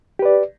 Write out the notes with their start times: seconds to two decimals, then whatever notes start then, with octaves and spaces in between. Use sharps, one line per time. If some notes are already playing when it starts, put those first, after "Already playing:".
0.19 G4
0.22 B4
0.25 D5